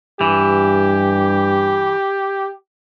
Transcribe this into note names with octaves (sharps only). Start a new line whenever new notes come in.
G2 E3 G4